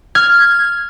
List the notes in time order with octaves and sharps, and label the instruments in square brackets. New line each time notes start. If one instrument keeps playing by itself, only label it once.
[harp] F6 [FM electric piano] G#6